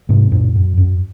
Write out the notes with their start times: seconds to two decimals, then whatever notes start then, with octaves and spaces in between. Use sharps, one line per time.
0.09 G#2 C3
0.32 F#2 A#2
0.56 F#2
0.78 F#2